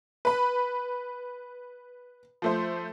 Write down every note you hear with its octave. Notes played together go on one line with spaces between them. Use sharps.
B4 B5
F3 A3 C5